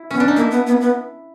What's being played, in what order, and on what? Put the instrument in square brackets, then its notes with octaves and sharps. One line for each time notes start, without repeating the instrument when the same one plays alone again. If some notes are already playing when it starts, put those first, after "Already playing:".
Already playing: [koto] E4
[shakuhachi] B3 [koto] C#4
[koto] D4
D#4
[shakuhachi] A#3 [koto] E4
[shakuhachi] B3
B3
B3